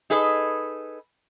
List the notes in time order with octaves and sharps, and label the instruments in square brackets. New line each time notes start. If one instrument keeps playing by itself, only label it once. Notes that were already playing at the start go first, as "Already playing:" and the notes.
[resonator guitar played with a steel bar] D#4 G#4 A4 B4 D#5